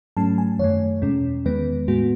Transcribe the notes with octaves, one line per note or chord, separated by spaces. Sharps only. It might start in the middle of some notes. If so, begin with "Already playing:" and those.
G#2 F#3 A3 C#4 A5
G#5
F#2 D#3 A3 C#5
E2 B2 G#3 C#4
E2 D#3 G#3 B3 B4
A2 G#3 B3 F#4